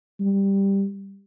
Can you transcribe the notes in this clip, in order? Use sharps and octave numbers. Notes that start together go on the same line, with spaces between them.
G3